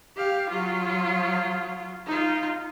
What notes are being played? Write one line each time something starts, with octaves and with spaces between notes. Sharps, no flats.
G4 F5
F#3 F4
D#4 F4